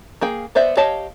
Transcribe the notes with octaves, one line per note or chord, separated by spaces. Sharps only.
A#3 G#4 G5
B3 C5 D5 E5
G4 C#5 D#5 F5 A5